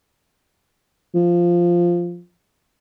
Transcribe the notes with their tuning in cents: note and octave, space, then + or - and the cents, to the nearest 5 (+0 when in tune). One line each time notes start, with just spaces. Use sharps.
F3 -5